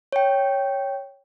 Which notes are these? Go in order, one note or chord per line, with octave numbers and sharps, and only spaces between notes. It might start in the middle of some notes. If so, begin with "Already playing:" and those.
C#5 G5